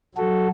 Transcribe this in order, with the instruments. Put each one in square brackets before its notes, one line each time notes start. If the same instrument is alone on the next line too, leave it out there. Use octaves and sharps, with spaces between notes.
[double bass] F#3 [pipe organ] F#4 A4